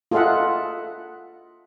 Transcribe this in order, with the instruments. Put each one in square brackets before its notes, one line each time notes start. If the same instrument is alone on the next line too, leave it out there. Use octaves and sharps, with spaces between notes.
[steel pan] F4 G#4 A4 D#5 E5 F#5